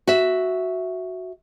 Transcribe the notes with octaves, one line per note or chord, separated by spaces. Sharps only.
F#4 E5